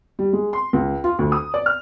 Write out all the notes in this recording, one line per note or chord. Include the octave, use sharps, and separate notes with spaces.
G3
G#3
C6
C#2
F4
D2
D#6
D5
F6